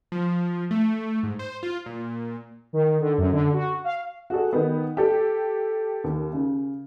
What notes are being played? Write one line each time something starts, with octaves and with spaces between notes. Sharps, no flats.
F3
A3
G#2
C5
F4
A#2
D#3
D3
F#2
D3
F#4
F5
F#4 G#4 A4
D#3 B3
G4 A4
D#2
C#3